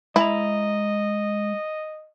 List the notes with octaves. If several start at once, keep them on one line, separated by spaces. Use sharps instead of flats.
G#3 E4 D#5 G#5 A#5